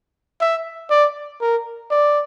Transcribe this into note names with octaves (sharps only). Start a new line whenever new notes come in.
E5
D5
A#4
D5